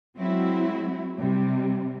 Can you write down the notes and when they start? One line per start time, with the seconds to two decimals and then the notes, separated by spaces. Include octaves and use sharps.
0.18 F#3 G#3 C4 E4 F#4
1.19 C3 G3